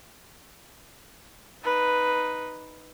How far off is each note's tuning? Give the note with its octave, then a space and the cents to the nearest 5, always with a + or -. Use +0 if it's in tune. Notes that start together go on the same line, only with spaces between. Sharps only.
D#4 +0 B4 +0